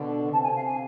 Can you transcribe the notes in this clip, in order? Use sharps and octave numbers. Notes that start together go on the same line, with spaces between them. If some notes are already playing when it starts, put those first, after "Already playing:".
Already playing: B2 D3
C3 A5
G#5
F5
G#5